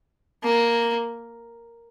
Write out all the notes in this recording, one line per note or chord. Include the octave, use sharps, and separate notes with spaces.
A#3